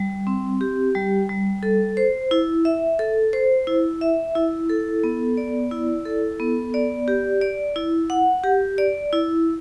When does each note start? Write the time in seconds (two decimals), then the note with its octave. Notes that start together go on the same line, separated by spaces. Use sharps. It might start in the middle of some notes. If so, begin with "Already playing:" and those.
Already playing: G3
0.27 C4
0.61 G4
0.95 G3
1.29 G3
1.63 A4
1.97 C5
2.31 E4
2.65 E5
2.99 A4
3.33 C5
3.67 E4
4.01 E5
4.35 E4
4.69 A4
5.04 B3
5.37 D5
5.71 E4
6.06 A4
6.39 B3
6.74 D5
7.08 G4
7.41 D5
7.76 E4
8.10 F#5
8.44 G4
8.78 D5
9.13 E4